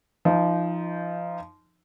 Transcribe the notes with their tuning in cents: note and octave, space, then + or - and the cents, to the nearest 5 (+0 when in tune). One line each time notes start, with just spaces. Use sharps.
F3 -20 D#4 +0